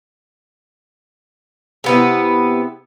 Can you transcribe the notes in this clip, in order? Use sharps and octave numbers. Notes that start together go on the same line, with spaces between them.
C3 B3 E4